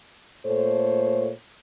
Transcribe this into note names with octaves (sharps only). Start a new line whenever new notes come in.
A#2 A3 A4 C5 C#5